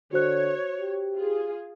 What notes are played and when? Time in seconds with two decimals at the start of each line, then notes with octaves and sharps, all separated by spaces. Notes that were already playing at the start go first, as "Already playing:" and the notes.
0.13 D3 F#4 C5 C#5 F#6
0.81 G4
1.16 F4 G#4